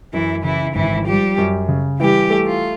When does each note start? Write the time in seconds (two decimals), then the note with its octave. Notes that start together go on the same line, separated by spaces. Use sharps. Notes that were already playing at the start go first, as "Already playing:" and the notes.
0.13 F#2 E3 E4
0.44 C#3 E3 E4
0.74 G#1 E3 E4
1.06 F3 G3 G4
1.38 F#2
1.68 C#3
1.99 E3 G3 G4
2.30 A3
2.46 F4